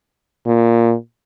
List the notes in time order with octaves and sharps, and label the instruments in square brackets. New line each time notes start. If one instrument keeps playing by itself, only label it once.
[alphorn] A#2